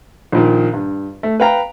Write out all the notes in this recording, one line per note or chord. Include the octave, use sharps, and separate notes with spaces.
A#1 A#2 D#3
G2
A3
B4 F5 G5 A#5